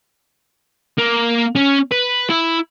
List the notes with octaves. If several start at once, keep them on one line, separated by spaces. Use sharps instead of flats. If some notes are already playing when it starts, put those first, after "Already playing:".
A#3
C#4
B4
E4